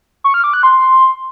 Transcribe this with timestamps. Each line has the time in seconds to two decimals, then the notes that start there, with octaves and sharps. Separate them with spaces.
0.24 C#6
0.34 F6
0.44 D6
0.54 F#6
0.63 C6